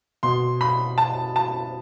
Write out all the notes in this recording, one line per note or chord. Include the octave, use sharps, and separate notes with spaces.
B2 C6
B5
A5
A5